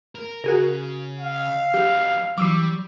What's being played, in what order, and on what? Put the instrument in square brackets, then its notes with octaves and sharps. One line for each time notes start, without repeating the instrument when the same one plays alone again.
[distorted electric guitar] A#4
[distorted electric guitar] C#3 [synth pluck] F#4 G#4 A#4
[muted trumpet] F5
[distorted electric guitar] F#3 D4 [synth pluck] G4
[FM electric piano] E3 F#3 [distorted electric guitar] G3 [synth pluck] D6 E6 C7